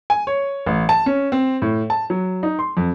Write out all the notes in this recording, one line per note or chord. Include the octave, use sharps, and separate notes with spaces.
G#5
C#5
A1
A5
C#4
C4
A2
A5
F#3
D#4
C6
F2